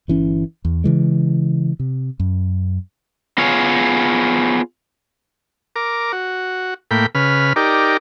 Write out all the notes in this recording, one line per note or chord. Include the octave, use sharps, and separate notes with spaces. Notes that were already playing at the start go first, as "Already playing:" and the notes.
G1 E3 C#4
E2
C#3 E3 G#3
C3
F#2
B3 F4 G#4 C#5
A#4 D6
F#4
A2 A#3 G5 B5
C#3 B4 F6
D#4 G4 A#4 D5